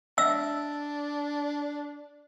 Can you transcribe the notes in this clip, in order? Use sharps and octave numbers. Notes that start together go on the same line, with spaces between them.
D4 D#5 E5 E6